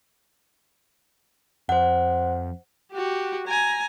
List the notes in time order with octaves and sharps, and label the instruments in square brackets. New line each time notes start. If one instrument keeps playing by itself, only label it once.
[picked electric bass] F2 [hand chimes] C5 F#5
[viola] F#4 G4
G#5 A#5